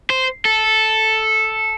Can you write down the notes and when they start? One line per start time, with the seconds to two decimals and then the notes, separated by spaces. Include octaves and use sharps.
0.10 C5
0.45 A4